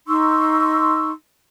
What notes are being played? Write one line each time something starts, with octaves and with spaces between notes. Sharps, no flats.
D#4 C6 C#6 E6